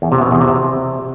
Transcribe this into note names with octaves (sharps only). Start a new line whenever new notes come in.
E2
C3
B2
E2
C3